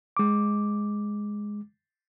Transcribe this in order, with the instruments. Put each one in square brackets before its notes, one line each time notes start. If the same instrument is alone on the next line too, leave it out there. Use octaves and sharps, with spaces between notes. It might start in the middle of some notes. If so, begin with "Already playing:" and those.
[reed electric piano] G#3 D6